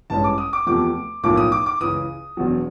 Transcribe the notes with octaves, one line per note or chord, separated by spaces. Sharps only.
A1 G2 E3 G#3 C#4 A5
D6
D#6
D6
E2 C3 F3 A3 D6
B1 A2 F3 A#3 D6
D#6
D6
D6
C#2 C#3 E3 D#6
E1 E2 B2 F#3